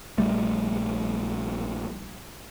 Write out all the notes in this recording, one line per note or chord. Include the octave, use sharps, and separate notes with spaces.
A#1 G3 A3